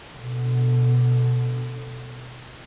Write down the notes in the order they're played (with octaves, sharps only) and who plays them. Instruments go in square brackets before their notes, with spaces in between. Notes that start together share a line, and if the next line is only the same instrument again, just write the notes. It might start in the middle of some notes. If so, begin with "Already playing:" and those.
[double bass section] B2 D3